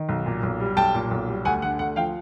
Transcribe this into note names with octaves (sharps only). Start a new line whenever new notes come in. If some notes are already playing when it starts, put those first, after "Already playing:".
Already playing: D#3
B1
A#2
B1
G3
B1 G5 A5
A#2
B1
G3
D2 F#5 G#5
D3 F#5
D2 F#5
F3 F5 G5